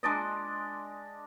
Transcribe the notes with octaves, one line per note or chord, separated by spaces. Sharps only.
G#3 D4 D5 D#5